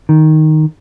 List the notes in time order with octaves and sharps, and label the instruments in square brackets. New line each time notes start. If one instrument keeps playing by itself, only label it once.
[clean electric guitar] D#3